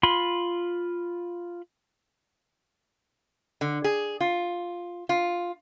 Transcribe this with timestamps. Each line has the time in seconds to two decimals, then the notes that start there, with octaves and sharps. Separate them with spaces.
0.03 F4 B5 C6
3.61 D3
3.84 G#4
4.21 F4
5.09 F4